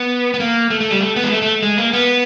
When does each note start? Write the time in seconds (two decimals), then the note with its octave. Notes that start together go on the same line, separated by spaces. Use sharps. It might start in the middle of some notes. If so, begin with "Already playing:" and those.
Already playing: B3
0.34 B3
0.40 A#3
0.70 A3
0.80 A3
0.91 G3
1.01 A3
1.16 B3
1.24 G#3
1.32 A3
1.42 A3
1.62 G#3
1.78 A#3
1.93 B3